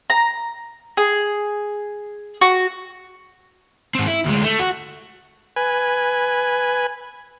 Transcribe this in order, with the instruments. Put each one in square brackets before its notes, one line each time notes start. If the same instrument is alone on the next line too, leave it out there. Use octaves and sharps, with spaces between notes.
[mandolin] A#5
G#4
F#4
[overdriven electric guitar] G#2 C4
E4
D2 G#3
A3
F#4
[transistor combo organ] B4 G#5